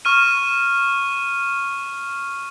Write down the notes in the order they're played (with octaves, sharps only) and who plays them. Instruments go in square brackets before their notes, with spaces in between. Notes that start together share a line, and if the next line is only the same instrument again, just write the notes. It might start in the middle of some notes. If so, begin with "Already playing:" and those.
[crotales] C#6 F6 D#7